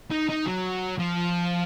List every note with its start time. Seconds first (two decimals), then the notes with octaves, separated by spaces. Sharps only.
0.11 D#4
0.29 D#4
0.46 F#3
0.99 F3